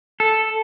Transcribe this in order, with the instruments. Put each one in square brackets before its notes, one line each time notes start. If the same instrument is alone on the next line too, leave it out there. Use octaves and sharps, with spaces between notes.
[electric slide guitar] A4